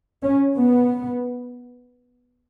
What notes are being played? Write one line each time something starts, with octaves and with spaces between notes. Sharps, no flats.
C#4
B3